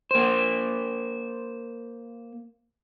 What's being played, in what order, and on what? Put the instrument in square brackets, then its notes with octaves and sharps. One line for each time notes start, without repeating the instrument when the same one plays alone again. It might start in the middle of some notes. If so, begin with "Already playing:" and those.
[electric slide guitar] A#3 C5